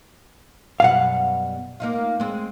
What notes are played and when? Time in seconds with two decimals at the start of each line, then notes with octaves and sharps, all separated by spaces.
0.80 F#2 B2 G3 F5 F#5
1.80 A#3 D#4 F4
2.20 G#3 C4